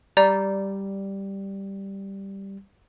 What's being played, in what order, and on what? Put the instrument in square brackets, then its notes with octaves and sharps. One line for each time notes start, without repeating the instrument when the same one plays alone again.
[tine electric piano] G3 [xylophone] D5 A#5